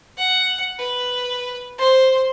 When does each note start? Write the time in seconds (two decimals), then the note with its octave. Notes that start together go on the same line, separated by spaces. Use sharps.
0.17 F#5
0.79 B4
1.78 C5 C6